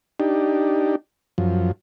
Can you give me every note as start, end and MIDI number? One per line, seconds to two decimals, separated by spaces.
0.20 0.96 62
0.20 0.96 63
0.20 0.96 67
1.38 1.72 42
1.38 1.72 53